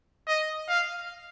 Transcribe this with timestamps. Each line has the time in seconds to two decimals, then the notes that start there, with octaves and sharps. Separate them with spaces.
0.27 D#5
0.68 F5